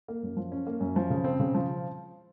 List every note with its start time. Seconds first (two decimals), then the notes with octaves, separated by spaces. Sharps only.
0.08 A#3
0.23 F#2
0.37 F3
0.52 C#4
0.67 A#3
0.81 F#2
0.96 F3
1.10 C#3
1.24 C4
1.40 C#3
1.54 F3